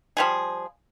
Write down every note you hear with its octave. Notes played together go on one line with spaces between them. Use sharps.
F3 G3 G#4